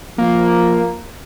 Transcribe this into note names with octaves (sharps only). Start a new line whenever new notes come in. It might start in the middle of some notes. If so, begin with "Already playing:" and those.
F3 A#3